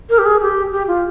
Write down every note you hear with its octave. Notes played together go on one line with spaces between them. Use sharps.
A#4
G4
G#4
G4
G4
F4